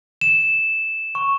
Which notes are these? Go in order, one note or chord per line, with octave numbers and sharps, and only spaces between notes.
E7
C#6